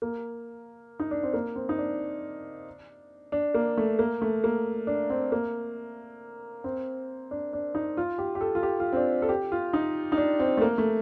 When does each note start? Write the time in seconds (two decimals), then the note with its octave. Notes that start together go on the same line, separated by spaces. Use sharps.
0.02 A#3
1.00 D#4
1.11 D4
1.23 C4
1.33 A#3
1.56 C4
1.69 D#4
1.78 D4
3.32 D4
3.54 A#3
3.77 A3
3.99 A#3
4.22 A3
4.44 A#3
4.87 D4
5.10 C4
5.32 A#3
6.64 C4
7.31 D4
7.53 D4
7.75 D#4
7.97 F4
8.18 G4
8.35 G4
8.41 A4
8.55 F4
8.63 G4
8.80 F4
8.93 C4
8.97 D4
9.22 A4
9.29 G4
9.52 F4
9.73 D#4
10.12 D#4
10.17 D4
10.40 C4
10.57 A3
10.61 A#3
10.78 A3